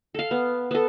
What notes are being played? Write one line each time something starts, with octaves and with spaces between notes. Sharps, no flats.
A4 F5
B3
B3 A4